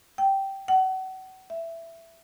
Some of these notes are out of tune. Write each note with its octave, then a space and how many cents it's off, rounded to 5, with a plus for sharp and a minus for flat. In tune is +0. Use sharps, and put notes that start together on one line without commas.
G5 -10
F#5 +35
E5 +10